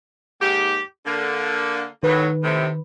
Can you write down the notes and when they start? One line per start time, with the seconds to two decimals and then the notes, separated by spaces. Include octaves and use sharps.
0.41 D#2 G#2 G4
1.06 D3 A#3
2.03 A2 D#3 F#3 B4
2.43 A2 C3